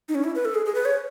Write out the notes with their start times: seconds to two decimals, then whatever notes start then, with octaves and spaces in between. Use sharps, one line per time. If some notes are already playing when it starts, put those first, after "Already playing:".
0.09 D#4
0.15 C#4
0.24 E4
0.35 B4
0.45 A4
0.55 G#4
0.66 G#4
0.75 B4
0.85 C#5